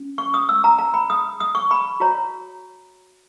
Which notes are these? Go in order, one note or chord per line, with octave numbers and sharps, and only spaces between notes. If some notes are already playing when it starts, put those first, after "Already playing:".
Already playing: C#4
C#6
D#6
E6
A#5
A#5
B5
D#6
D#6
C#6
B5
F#4 C#5 A#5